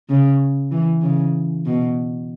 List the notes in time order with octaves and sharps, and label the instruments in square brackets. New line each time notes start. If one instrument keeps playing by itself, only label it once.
[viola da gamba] C#3
E3
C#3
B2